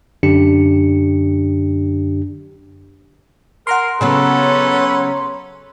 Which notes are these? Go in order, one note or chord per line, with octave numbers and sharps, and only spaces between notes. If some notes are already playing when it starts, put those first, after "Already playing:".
F#2 D3 D4 G4 C#7
A#4 F#5 A#5 C6
C#3 F#3 B3 C#4 A4 B4